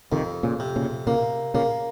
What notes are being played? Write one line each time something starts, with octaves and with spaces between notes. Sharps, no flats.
F2 C3 D#3
A#2 C#3
C3
A#2 C#3
A#2 C#3 A#3
A#2 C#3 A#3